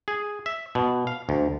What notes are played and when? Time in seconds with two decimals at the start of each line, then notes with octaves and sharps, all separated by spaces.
0.08 G#4
0.46 E5
0.75 B2
1.07 F5
1.29 D2